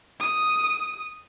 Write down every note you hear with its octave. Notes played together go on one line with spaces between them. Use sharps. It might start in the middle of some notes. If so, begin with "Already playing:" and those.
D#6